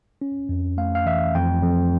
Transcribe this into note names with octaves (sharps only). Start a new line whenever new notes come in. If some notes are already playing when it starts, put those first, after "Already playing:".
C#4
F2
A3 F5
F5
E3 E5
F2 G5
F2